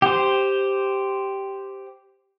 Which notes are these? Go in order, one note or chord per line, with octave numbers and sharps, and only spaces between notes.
G4 C5